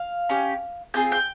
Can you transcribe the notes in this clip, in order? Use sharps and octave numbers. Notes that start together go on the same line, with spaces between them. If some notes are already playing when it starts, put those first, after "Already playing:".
Already playing: F5
C#4 G4
C4 F4 G#4 G6
G5 G6